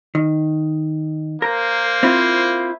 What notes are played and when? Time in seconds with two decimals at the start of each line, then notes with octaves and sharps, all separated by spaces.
0.15 D#3
1.42 A#3 A#4 C5
2.03 C4 E4 F4